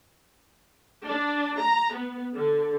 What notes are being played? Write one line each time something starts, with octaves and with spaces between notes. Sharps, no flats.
D4
A#5
B3
D3